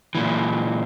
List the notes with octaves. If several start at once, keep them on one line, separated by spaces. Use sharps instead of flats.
A#2 E3